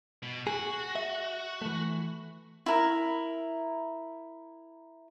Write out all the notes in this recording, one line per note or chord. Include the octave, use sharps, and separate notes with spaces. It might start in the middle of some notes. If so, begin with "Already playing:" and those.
B2
F#4 G#4
E5
E3 A3
E4 A#4